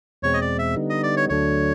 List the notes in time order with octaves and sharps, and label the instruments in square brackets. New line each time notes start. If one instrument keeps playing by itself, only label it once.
[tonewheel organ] E2 B2 G#3 C4 [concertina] C#5
[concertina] D#5
D5
E5
[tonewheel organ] D3 G3 B3 D#4
[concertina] D#5
D5
C#5
[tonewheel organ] D2 D3 F#3 A3 D4 [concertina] C#5